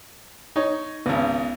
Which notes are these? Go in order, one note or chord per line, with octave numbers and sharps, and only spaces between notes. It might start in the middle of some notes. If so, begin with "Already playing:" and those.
D#4 C#5
G#1 C#2 B3